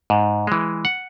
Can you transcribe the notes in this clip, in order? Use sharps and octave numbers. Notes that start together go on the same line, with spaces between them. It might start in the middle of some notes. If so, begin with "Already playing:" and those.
G#2
E3 G#3
F#5